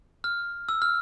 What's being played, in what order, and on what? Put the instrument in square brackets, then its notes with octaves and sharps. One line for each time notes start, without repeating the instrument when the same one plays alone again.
[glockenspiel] F6
E6
F6